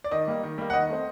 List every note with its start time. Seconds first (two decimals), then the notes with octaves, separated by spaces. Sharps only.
0.04 D5
0.11 D#3 D#5
0.27 G3 A#3
0.43 D#3
0.58 G3 A#3
0.70 F#5
0.73 D#3 D#5
0.89 A3 C4